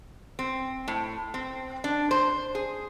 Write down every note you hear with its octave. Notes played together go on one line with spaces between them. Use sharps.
C4
A2
C4
D4
C5
G#4